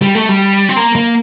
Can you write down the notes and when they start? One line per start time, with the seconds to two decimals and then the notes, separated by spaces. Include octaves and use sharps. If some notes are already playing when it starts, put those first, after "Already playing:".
0.02 G3
0.15 A3
0.29 G3
0.69 C4
0.76 A#3
0.95 A#3